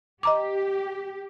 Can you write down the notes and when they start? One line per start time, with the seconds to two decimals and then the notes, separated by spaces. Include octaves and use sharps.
0.23 G4 D#5 A#5 D6